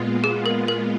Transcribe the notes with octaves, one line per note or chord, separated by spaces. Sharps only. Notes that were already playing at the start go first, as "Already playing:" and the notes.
Already playing: A#2 G#3 B3 F4
G#4
A#4
A#4